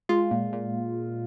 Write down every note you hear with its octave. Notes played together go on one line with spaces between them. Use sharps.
G#3 F4
A#2
A#2